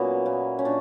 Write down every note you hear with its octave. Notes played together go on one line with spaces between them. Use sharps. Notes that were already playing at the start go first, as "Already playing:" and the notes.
Already playing: A#2 F#3 B3 C#4 E4 F#4
A#2
C#4
A#2 D4